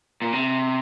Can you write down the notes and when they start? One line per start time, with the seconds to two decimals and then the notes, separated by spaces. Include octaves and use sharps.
0.22 A#2
0.32 C3